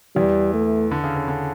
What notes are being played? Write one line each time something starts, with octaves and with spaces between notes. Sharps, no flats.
E2 E3 G3
A3
D3
C#3
C#3
D3